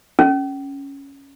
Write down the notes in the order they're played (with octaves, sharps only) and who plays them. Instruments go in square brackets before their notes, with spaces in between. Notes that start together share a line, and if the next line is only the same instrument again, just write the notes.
[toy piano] C#4